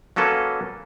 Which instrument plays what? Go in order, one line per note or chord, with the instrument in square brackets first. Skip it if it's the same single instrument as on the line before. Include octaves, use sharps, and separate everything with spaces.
[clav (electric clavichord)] F#3 A#3 C#4 A4 B4